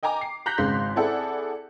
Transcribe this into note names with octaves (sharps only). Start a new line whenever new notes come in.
D#5 G5 G#5 A#5 D6
C7
A#5 F#6 G6 A#6 B6
G#1 C#3 G#3 F5 C6 B6
C4 E4 G#4 A4 D5 F#5